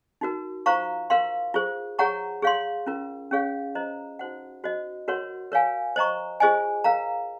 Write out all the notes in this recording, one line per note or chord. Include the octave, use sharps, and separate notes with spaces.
D#4 F#4 A#4
F4 C5 F5 A#5 C#6
A#4 F5 C6
F4 G#4 C5
G#4 C#5 F#5 A#5 C#6
G#4 C#5 F5 C6
C#4 F4 A#4
C#4 G#4 C#5 F5
F4 C5 D#5 A#5
D#4 F#4 C5 F#5
F#4 C5 D#5
F#4 A#4 C#5 F#5 C6
A#4 C#5 F5 G#5
C5 D#5 A#5 C#6
F4 G#4 C5 D#5 G#5
A#4 F5 A#5